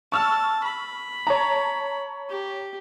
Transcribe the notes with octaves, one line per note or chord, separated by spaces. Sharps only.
A5 C#6 E6 F6
B5
C#5 A5 A#5
G4